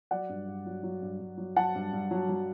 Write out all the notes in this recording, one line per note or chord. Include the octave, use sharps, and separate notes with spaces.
F#3 D5 F#5
G2
G2
F#3
F#3
G2
G2
F#3
F#3 F#5 A5
G2
G2
F#3
F#3